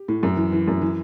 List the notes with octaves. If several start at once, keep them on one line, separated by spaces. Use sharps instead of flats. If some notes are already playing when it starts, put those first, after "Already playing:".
Already playing: G4
A2
F#2
E3
E3
F#2
E3